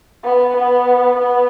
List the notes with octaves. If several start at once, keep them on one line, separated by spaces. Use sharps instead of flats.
B3
B3
B3